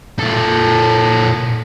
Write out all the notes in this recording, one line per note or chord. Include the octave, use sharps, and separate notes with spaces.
A#2 A4